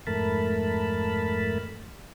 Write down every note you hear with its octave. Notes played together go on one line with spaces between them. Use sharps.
F2 G#2 A3 A#4 A5 B5